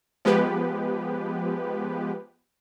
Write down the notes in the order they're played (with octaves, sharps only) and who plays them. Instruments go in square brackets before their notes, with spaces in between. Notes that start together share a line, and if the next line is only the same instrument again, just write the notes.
[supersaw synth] F3 G#3 B3 G4 B4